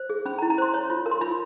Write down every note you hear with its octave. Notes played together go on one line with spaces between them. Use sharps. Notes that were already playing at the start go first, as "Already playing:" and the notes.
Already playing: C5
G#4
C#4 B5
A#5
E4
A#5
C5 C6
C#5
F4
A#4
C6
F4 B5